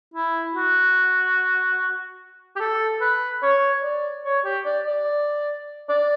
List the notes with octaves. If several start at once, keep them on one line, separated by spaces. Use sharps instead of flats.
E4
F#4
G4
A4
B4
C#5
D5
C#5
G4
D5
D5
D5